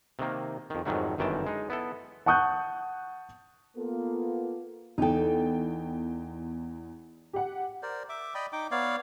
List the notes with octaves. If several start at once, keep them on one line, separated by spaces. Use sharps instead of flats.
C3 D#3 A#3
F2 D#3
F2 G#2 D#3 F#3 G3 A3
G1 F#2 D#3 E3 G5 A5
G#3 D#4
B3 E4 A4
F#5 A5 C#6 D#6 F#6 G6
A#3 B3 F4 A4
E2 D#4 A4 G5
G4 F#5
A#4 C5 D5
E5 D6
D5 D#5 G5 B5
D#4 G5 D6
B3 C#5 D5 F5